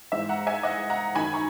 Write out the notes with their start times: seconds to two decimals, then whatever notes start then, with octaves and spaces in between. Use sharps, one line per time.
0.12 G#2 E3 E5
0.29 F#5 A#5
0.47 E5 G#5
0.63 D#5 F#5
0.90 F#5 A#5
1.15 F#2 D#3 G#5 B5
1.33 A#5 C#6